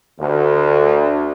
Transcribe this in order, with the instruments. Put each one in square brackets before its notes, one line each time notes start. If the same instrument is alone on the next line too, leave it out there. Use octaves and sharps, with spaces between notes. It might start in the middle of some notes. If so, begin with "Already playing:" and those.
[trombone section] D2